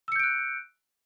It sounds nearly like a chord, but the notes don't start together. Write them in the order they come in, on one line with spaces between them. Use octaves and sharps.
E6 C#7 G6 D7 F#6